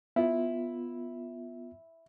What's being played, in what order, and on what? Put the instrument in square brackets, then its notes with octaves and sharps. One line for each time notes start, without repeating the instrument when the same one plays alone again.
[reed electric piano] B3 F4 [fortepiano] E4